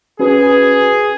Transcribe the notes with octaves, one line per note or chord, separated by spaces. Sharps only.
C#4 F#4 G#4 B4